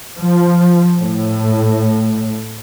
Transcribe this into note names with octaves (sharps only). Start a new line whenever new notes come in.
F3
A2